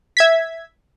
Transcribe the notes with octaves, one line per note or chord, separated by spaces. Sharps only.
E5 G#6 B6